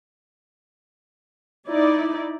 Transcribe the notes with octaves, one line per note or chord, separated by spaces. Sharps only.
D#4 E4 D5